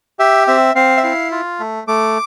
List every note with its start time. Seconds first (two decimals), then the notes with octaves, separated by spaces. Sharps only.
0.19 G4 E5
0.47 C4 E5
0.75 C4 F5
0.97 E5
1.03 E4 F5
1.31 F4
1.60 A3
1.87 A3 D6